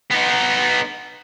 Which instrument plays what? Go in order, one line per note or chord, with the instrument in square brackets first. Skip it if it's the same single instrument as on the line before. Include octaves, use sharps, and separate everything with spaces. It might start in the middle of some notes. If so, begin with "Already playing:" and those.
[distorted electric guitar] B3 D#4